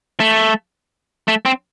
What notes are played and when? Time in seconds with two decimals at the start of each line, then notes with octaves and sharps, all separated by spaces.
0.20 A3
1.28 A3
1.45 C4